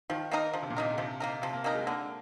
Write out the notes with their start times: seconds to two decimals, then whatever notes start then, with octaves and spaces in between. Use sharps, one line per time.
0.10 D#3 F3
0.31 A#3 D#4 A#4
0.53 D3 F3
0.63 C3
0.70 A#2
0.76 C3 A#3 D#4 A#4
0.94 D3
0.98 C3 F3
1.20 A#3 D#4 A#4
1.42 C3 F3
1.53 A#3
1.64 A#3 C4 D#4 A#4
1.75 G#3
1.87 D3 A#3